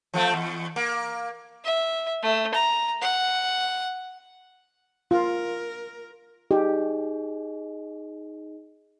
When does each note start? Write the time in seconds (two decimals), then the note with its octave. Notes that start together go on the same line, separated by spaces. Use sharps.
0.14 F3 A3 C4
0.34 E2
0.76 A#3
1.64 E5
2.22 A3
2.54 A#5
3.01 F#5
5.11 F4 A#4
6.51 D#4 G4 G#4 D#5